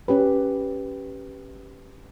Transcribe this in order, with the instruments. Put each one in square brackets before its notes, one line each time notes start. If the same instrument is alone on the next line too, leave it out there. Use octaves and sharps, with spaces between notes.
[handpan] C#4 G4 B4